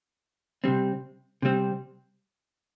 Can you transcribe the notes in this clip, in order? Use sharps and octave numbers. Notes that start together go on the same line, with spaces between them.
C3 G3 C4
C3 G3 C4